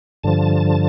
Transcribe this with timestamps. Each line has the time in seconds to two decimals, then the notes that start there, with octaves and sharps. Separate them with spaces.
0.24 G2 D3 F3 A5